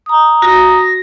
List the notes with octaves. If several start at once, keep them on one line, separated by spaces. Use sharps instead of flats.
A#5 D#6
F#4 A#6